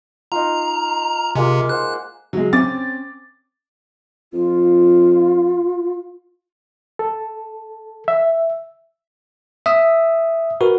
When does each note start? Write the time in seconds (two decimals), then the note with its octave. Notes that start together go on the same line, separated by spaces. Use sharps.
0.32 D#4 F4 A#5
1.35 C3 G#3 A#3 F4
1.69 C5 F#5 F#6
2.33 F#3 G#3
2.53 C4 C#4 D6 A6
4.33 F2 F4
6.99 A4
8.08 E5
9.66 E5 D#6 E6
10.61 F#4 A#4 B4